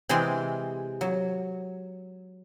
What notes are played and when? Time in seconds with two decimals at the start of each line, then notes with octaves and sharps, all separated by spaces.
0.09 C3 E3 G#3 G5 C6
1.01 F#3